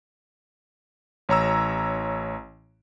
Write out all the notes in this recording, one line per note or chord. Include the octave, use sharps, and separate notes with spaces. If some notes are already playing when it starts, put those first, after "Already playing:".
A1 C#5 A#5 E6